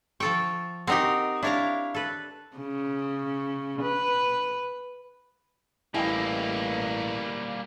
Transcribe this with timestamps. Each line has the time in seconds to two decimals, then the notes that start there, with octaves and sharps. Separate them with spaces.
0.20 F3 A4 G5 C#6
0.87 C4 D#4 F#4 G4 A#4 D#5
1.43 D4 E4 A#4 C#5 F5 A#5
1.94 A4 B4
2.57 C#3
3.82 B4
5.94 A1 G3 A#3 E4 D#5 G5 G#5